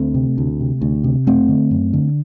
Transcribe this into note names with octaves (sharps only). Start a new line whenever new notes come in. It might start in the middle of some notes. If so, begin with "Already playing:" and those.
Already playing: D2 A3 C4
C3
D2
C3
D2
C3
F#2 A3 C4
D3
F#2
D3